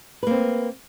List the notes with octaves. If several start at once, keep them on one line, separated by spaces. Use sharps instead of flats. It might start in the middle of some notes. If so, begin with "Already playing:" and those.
A#3 C4 B4